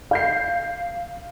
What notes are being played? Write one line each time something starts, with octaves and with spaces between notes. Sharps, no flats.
F5 G6 C7